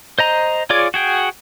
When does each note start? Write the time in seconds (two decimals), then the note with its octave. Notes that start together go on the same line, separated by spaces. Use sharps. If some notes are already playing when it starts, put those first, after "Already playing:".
0.19 C5 D#5 A#5
0.70 F4 G#4 C#5 D5 D6
0.94 F#4 G#4 G5